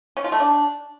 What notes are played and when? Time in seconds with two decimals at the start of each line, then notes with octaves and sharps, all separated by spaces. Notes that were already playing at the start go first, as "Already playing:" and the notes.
0.17 C#4
0.24 F4
0.32 A3
0.40 D4